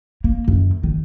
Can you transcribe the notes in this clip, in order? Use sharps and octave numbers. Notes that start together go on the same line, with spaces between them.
A#3
F#2
D#3